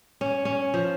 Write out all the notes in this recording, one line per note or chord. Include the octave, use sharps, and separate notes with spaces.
C#4
C#4
F3